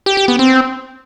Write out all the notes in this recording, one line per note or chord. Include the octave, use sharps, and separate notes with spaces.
G4
G4
B3
C4